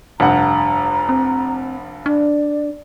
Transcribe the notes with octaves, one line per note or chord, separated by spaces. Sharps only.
F1 G2 F#5 A#5
C4
D4 D5